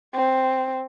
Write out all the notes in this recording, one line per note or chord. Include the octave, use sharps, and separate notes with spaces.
C4